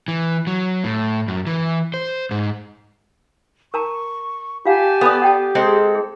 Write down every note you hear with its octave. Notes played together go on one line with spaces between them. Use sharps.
E3
F#3
A2
F#2
E3
C5
G#2
A#4 A5 A#5 C#6
F4 G4 F5 F#5 G#5 A5
B3 A4 D5 B5 D#6
G4 F#5 G5 A5
G#3 C4 A4
G#4